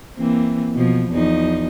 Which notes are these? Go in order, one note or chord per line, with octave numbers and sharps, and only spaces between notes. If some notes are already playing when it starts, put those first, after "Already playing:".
E3 A#3 C4
B2 F3
E2 F3 D#4